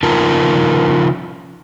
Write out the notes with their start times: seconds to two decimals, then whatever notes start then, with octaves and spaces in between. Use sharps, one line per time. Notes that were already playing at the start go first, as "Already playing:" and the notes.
0.03 C#3 F3 D#4 F4 A#4 A5